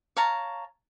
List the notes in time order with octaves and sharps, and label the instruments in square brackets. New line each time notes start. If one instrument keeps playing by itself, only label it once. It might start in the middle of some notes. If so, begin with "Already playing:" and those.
[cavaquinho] C#5 F5 A5 A#5